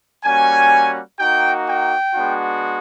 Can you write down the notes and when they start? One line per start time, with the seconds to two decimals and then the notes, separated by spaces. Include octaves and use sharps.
0.24 G3 A#3 C#4 F#4 G#5
1.19 A#3 D#4 F#4 G5
1.67 G5
2.14 G#3 B3 D4 F#4